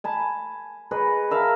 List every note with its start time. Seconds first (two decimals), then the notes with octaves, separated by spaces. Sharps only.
0.04 G#5 A5 B5
0.91 G#4 B4 C#5 D#5
1.31 A#4 E5 F5 A5